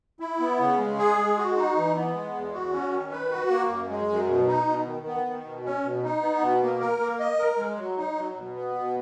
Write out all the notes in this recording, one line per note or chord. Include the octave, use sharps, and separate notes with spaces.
E4
B3
C#3
G#3
G#4
G#3
F#4
D#4
E3
B3
G#3
E2
F#4
C#4
D#3
B4
F#4
A#3
F#2
G#3
F#2
B2
D#4
B2
D#3
B3
D#3
B2
C#4
B2
D#4
B3
B2
A#3
A#4
A#3
D#5
A#4
G#3
F#3
D#4
F#3
B2
B3
B2